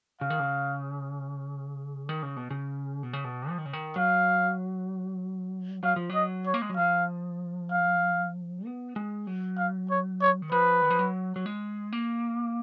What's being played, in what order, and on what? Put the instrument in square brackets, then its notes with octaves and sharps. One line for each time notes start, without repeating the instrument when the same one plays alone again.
[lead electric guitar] C#3 [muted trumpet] F5
[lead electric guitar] D#3
C#3
D#3
C#3
B2
C#3
B2
C#3
B2
F3
D#3
C#3
D#3
[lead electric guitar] F#3 [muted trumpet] F5
[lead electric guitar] F#3 [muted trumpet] F5
[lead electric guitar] F3
[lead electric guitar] F#3 [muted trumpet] D#5
[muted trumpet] C#5
[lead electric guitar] A#3
G#3
F#3
[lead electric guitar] F3 [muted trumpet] F5
[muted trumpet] F5
[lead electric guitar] B3
G#3
F#3
[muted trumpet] F5
C#5
C#5
[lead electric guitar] D#3
[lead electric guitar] F3 [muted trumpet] B4
[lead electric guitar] D#3
F3
F#3
F#3
G#3
A#3